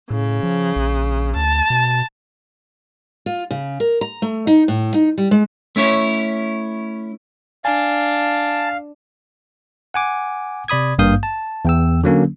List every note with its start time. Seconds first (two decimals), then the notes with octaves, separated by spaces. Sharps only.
0.10 A2 C#3
0.43 F3
0.76 A#1
1.36 D2 A5
1.70 B2
3.26 F4
3.51 C#3
3.80 A#4
4.01 A#5
4.22 A3
4.47 D#4
4.68 A2
4.94 D#4
5.18 G3
5.31 G#3
5.76 A3 C#4 E4 C#5
7.65 D4 F5 G#5 A5
9.94 F#5 G#5 D6
10.68 C3 D5 B5 D#6 G#6
10.98 G#1 G2 A#3 F5 D#6 G6
11.23 A5
11.65 E2 G5 E6
12.04 D3 F#3 A#3 C#4